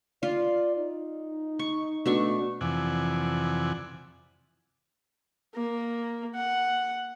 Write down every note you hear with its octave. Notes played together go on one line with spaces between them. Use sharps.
F4 D5
D#4
C#6
B2 A3 D4 C#6
F2 C3 E3 D5 F#5 G#5
A#3
F#5